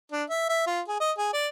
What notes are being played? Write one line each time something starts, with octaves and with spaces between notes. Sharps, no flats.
D4
E5
E5
F4
G#4
D#5
G#4
D5